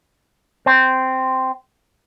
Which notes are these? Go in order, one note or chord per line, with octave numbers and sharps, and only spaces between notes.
C4